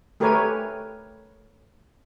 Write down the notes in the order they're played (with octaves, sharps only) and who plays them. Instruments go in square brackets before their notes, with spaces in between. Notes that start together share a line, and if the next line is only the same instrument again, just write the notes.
[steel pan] A3 G4 A#4 B4 C#5 G#5